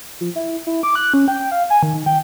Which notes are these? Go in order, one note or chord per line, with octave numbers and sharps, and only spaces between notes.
F3
E4
E4
D6
F#6
C#4
G5
F5
G#5
D#3
D#3
G5